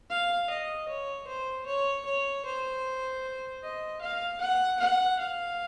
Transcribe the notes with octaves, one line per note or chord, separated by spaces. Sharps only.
F5
D#5
C#5
C5
C#5
C#5
C5
D#5
F5
F#5
F#5
F5